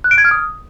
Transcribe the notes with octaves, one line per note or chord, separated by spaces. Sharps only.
F#6
D7
G#6
F6
D#6